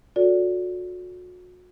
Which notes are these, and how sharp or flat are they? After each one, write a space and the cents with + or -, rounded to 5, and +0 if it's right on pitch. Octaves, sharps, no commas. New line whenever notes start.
F#4 -35 A4 +0 D5 -25